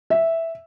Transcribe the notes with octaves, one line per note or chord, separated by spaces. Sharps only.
E5